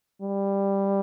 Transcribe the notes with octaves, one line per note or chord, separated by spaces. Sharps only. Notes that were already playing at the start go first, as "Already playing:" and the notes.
G3